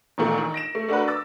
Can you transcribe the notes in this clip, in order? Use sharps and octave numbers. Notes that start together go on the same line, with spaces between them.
A#1 A#2 D#3 A3 A#3
D#3
A#6 D7 E7
A3
A3 D4 F#4 A#4 B4
D6 E6 A6